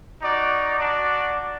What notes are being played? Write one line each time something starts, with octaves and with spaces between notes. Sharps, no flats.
D#4 F#4 D5
D4 F#4 D5